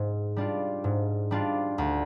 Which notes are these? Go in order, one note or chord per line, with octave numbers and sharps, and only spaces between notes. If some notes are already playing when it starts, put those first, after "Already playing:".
Already playing: G#2
G3 D4 F4
G#2
G3 D4 F4
D2